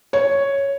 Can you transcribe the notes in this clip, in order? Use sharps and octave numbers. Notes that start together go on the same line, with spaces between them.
C#5